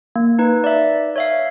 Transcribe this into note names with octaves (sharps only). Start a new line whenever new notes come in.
A#3
D#4 B4
D5 E5
C#5 E5 F5